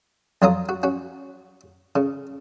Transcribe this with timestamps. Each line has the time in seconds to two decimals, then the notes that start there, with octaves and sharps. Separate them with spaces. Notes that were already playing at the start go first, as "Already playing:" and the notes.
0.42 F2 F#3 C#5 F5 A#5 D#6
0.69 F#4
0.83 C#4 F#4
1.96 C#3